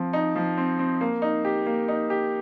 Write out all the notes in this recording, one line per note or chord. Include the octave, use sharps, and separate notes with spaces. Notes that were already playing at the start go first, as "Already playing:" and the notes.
Already playing: F3 C4
D#4
F3
C4
C4
A#3
D#4
G4
A#3
D#4
G4